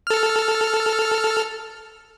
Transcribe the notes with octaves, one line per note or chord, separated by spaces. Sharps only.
A4 F6